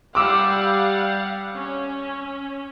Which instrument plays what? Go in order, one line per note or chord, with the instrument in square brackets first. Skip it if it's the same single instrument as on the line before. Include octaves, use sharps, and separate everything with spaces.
[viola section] G3 F5 F#5 [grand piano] D6 E6
[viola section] C#4